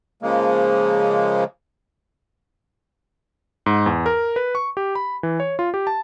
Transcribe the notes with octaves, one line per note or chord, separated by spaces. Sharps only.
C#3 F3 G#3 A#3
G#2
E2
A#4
B4
C#6
G4
B5
E3
C#5
F4
G4
A5